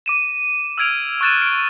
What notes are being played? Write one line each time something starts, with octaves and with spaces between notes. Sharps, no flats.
D6 D#7 E7
E6 F6 G#6 D7 F7
C#6 F6 F#6 A6 D#7 E7
F6 D7